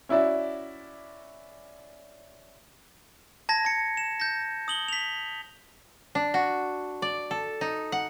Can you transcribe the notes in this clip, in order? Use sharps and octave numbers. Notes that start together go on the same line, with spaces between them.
C#4 E4 F#4 D5 E5
A5 G#6 A#6
A5 C#7
E7
G6 A#6
D#6 F#7 G7
B6 F7
D4
F#4
D5
A4
D#4
F#5